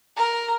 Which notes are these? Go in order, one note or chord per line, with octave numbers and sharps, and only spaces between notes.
A#4